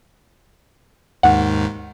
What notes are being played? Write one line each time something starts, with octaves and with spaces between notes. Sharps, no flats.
D#2 G#2 D#3 F#5